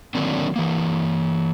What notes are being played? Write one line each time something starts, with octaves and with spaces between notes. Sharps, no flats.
D3 D#3 F#3 A#3 C4 D4
E3 A#3